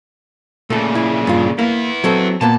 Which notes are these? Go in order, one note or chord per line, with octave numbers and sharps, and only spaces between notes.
A#2 C#3 A3 A4
E4
G2 F4
A#3 B3 E4
F#3 C4 A4
A#2 A#3 B3 A5